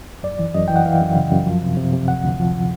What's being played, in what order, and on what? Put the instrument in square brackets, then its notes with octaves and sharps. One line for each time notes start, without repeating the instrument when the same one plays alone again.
[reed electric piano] F#2 D5
E3
F#2 D#5
E3 G5
F#5
E3 F5
F#2
C#3
F#2
F3
C3
C3
C3
D2 F#5
D2
F3